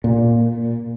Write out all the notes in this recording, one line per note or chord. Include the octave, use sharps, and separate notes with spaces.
A#2